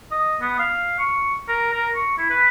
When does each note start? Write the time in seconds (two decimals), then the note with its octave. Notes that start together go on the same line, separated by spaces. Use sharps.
0.12 D#5
0.41 B3
0.59 F5
0.99 C#6
1.49 A#4
1.74 A#4
1.96 C#6
2.18 E4
2.30 B4